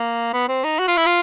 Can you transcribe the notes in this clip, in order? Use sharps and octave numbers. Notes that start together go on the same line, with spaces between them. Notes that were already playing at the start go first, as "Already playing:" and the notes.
Already playing: A#3
B3
C4
D#4
F#4
F4
E4
F4